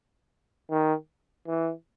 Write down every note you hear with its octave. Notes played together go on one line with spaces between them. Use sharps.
D#3
E3